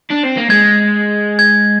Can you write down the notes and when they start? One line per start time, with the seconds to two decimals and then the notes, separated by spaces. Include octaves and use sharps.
0.11 D4
0.24 C4
0.37 A#3
0.50 G#3 G#6
1.39 G#6